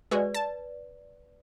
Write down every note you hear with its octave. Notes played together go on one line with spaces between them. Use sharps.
G#3 F#4 G#4 B4 D5
A5